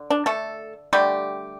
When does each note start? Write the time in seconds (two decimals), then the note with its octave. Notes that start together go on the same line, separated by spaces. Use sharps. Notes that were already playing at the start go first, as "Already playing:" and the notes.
Already playing: D3
0.10 D4
0.26 A3 A4
0.93 D3 G3 A3 G4